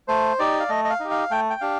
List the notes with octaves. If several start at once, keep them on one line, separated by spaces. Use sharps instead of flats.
A3 C5
D#4 G4 D5
F5
A3 D#5
D#5
F5
D#4 G4
F5
A3 G5
G5
D4 G4 F5